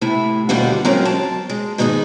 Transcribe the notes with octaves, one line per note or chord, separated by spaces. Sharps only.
A2 C3 A3 E4
D#2 B2 D3 G3 F4 F#5
F#3 G#3 C4 C#4 F4 A#4
A5
G#3
G#2 D#3 B3 D#4 G#4